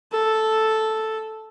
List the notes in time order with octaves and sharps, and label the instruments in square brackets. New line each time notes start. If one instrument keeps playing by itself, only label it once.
[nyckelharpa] A4